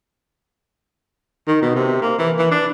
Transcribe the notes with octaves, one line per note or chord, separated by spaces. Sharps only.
D#3
B2
C3
A#3
E3
E3
D4